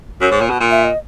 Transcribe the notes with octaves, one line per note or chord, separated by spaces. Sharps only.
F#2 C#5
G#2
A#2
B2
A#2
E5
D#5